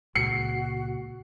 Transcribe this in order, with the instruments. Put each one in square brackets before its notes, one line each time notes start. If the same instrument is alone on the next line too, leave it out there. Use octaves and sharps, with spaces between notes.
[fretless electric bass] C#2 A#2 G#3 [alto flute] F#4 [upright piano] C7 C#7